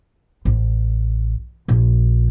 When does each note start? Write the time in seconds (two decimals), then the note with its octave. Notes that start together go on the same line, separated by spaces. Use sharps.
0.45 A1
1.68 A#1